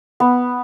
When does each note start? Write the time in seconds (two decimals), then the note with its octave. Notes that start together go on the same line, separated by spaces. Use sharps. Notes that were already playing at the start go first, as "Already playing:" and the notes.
0.20 B3